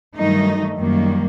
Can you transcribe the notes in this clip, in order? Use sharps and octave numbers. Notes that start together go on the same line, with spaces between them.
G2 D#3 F#3 A3 D#4
F#2 D#3 G3 A#3